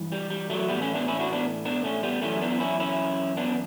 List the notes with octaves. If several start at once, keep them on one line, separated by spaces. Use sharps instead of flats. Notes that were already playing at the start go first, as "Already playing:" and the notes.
Already playing: G2 E3
G3
G3
F#3 A3
A2 E3 G3 B3
A3 C#4
B3 D4
C#4 E4
D4 F#4
B3 D4
B3 D4
A3 C#4
G3 B3
F#2 E3 A3 C#4
B3 D4
C#4 E4
C#4 E4
B3 D4